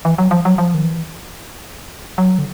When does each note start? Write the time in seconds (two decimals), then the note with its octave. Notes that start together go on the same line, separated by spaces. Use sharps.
0.05 E3
0.18 F#3
0.31 F3
0.45 F#3
0.58 F3
0.74 D#3
0.84 E3
2.18 F#3
2.38 D3